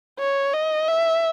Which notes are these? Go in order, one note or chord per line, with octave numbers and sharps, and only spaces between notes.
C#5
D#5
E5